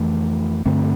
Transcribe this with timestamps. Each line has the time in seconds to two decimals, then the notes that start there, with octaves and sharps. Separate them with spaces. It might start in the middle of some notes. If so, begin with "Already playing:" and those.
Already playing: F2 E3 A3
0.66 G2 D3 A3 C4